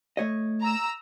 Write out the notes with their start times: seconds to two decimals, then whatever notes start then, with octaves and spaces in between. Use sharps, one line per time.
0.17 A3 C#5 D#5
0.62 A#5 E6